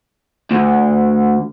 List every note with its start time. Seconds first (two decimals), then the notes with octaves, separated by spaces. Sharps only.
0.51 D2